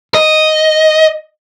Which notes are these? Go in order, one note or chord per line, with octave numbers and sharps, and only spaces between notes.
D#5